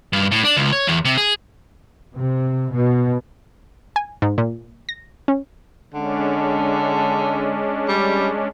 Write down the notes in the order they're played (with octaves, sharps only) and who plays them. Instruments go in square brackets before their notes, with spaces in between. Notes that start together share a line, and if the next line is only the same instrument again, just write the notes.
[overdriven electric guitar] G2
A2
D4
C#2
C#5
E2
C3
G#4
[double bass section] C3
B2
[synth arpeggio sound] G#5
G#2
A#2
A#6
C#4
[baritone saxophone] D3 [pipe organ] G#3 C#4 D4
[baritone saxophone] G3